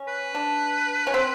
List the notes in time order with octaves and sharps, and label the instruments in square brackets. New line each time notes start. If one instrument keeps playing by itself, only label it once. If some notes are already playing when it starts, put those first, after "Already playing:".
Already playing: [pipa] C#4
[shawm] B4
[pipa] D4
C#4
C4